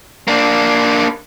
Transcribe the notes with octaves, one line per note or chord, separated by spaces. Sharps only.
A#3 D4